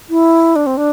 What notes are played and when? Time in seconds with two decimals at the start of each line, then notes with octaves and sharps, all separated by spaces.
0.10 E4
0.56 D4
0.66 C4
0.77 D4